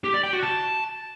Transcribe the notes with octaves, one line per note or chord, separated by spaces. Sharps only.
G4
D5
G5
F#4
A5